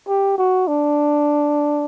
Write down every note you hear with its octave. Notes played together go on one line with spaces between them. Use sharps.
G4
F#4
D4